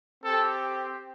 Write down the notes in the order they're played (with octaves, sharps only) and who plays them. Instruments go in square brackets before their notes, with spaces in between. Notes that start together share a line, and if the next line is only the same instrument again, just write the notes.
[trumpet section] C4 G4 A4